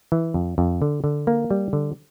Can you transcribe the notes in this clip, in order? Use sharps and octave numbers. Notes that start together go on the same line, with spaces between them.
E3
F2
F2
D3
D3
A#3
G3
D3